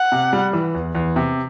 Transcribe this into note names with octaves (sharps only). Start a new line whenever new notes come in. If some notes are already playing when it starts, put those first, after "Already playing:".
Already playing: F#5
C3
G3
E3
E2
E2
C3